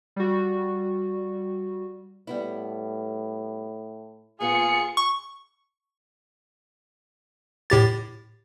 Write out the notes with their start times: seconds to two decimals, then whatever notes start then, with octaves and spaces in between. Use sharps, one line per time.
0.16 G3 F#4
2.27 A2 G3 B3 E4
4.40 A#2 B3 F4 G#4 C#7
4.97 C#6
7.70 A2 G4 A6